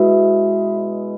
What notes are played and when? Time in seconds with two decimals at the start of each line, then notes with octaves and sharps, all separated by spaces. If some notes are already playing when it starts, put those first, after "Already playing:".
Already playing: B2 G#3 E4